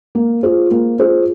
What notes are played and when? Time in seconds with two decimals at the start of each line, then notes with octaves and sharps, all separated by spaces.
0.15 A#3
0.43 F4 G#4 C5
0.71 A#3
0.99 F4 G#4 C5